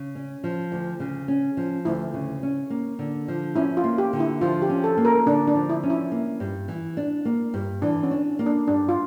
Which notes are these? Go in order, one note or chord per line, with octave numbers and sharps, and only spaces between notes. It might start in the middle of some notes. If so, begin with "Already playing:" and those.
Already playing: C#3
C#4
F3
D2
C#3
C#4
F3
D2 E4
C#3
C#4
A#3
D3
F3
C#4 E4
F4
A#3
G4
D3
E4
F3 F4
G4
C#4
A4
A#3
A#4
D3 D4
D4
F3
E4
C#4
E4
A#3
G2
E3
D4
A#3
G2
E3 D4
C#4
D4
A#3
D4
G2 D4
F4